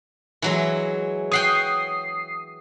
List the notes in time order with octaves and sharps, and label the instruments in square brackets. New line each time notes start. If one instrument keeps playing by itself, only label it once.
[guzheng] E3 F#3 G#3
[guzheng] C#5 F#5 G5 [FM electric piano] D#6 C7